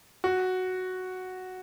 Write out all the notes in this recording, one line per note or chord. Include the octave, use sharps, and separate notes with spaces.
F#4